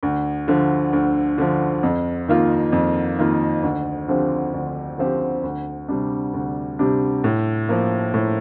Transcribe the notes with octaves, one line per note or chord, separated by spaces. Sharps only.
D2
D3 F3
D2
D3 F3
F2
D#3 A#3 F4
F2
D#3 A#3 F4
D2
D3 F3 C4 G4
D2
D3 F3 C4 G4
D2
C3 G3 D4
D2
C3 G3 D4
A2
F3 A#3
A2